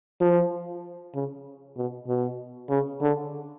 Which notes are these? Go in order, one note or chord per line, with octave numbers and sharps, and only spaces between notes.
F3
C#3
B2
B2
C#3
D3